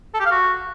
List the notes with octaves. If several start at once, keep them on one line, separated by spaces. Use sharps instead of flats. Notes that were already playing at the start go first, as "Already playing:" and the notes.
A4
G4
F5
F#4